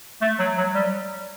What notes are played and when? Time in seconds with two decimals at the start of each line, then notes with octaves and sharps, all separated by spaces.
0.22 A3
0.39 F#3
0.58 F#3
0.75 G3